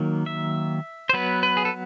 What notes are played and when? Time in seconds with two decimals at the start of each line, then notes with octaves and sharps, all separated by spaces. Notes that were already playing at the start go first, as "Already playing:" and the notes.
Already playing: D#3 F#3 A#3
0.26 E5
1.09 C5
1.13 F#3 B3 B4
1.43 B4
1.57 G#4
1.65 A4